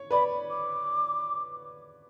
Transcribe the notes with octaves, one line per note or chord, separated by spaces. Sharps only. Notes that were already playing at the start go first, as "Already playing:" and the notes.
Already playing: C#5
B4 D5 B5
D6